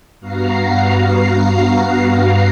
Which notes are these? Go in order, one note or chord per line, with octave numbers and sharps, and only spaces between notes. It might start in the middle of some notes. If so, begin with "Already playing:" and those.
G2 B3 F#4 F5 A#5 C7